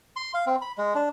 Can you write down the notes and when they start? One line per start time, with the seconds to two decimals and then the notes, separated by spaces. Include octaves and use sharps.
0.16 C6
0.34 F5
0.47 C4
0.62 B5
0.78 G#3
0.95 D4